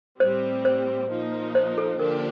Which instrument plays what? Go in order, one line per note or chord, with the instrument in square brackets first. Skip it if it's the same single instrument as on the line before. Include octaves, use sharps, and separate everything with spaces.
[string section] A2 G3 C4 [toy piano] C5
[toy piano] C5
[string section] A#2 F3 A#3 D#4
[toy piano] C5
A4
[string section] D3 F3 A#3 D4 G4 [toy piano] A#4